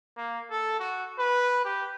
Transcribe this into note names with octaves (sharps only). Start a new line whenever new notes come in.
A#3
A4
F#4
B4
G4